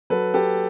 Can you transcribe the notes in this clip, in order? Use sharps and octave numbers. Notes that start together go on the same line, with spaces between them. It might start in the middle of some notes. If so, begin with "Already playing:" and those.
F#3 A4 B4
G4 A4